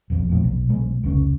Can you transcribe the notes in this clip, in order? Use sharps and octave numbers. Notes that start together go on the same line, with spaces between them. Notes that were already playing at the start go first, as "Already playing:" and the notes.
E1 B1 F2
A#1 F2 A2
B1
B1 G#3
F1 C#2 C#4